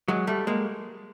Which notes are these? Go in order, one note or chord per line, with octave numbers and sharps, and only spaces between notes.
F#3 G#3
G3 A3
G#3 A#3